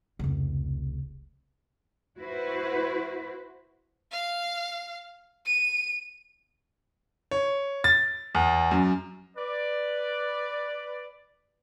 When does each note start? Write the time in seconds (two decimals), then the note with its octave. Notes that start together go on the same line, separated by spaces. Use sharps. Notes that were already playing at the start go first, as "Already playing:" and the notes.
0.19 F1 C#2
2.18 E4 F#4 B4 C5
4.12 F5
5.46 D#7
7.31 C#5
7.84 A6
8.35 E2
8.71 F#2
9.36 B4 D5